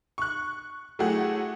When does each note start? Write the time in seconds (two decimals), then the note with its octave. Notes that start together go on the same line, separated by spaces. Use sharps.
0.18 C#6 F#6
0.99 F#3 A3 E4 G4 G#4 F#5